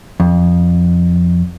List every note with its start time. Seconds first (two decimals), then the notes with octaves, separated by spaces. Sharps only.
0.20 F2